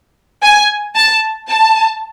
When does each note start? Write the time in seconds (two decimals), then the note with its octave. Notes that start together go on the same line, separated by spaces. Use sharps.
0.42 G#5
0.95 A5
1.48 A5